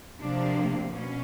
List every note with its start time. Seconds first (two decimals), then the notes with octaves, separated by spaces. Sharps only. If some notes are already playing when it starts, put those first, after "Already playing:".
0.20 C3 F3 A#3 D4
0.93 B2 C#4